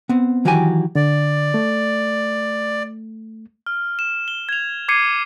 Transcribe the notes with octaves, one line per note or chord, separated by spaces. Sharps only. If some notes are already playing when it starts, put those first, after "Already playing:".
B3 C4
D#3 E3 F#3 F#4 G4 G#5
D3 D5
A3
F6
E7
G7
G#6 F7
D6 G#6 C7 C#7 D#7